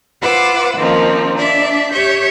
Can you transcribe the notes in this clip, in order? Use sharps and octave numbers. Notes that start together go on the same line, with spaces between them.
F4 B4 C5 F#5 D6 E6
D#3 F3 A#3 C4 C#4
D4 D5 E5
G4 C#5 E5 G6